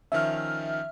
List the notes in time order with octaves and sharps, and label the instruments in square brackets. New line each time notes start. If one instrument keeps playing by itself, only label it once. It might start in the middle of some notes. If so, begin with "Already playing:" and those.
[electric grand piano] D#3 F3 C#4 [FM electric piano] E5 F6